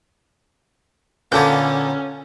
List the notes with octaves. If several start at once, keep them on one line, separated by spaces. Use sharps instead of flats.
A#2 D3 A#3 B3 C#4 A4 G6